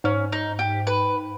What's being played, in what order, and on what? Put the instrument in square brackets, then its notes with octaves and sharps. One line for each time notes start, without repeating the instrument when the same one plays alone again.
[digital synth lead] G#2 [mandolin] C#4
[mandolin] D#4
G4
B4